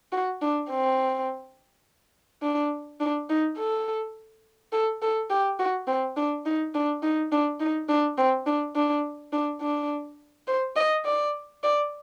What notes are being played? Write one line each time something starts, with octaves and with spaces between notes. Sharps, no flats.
F#4
D4
C4
D4
D4
D#4
A4
A4
A4
G4
F#4
C4
D4
D#4
D4
D#4
D4
D#4
D4
C4
D4
D4
D4
D4
C5
D#5
D5
D5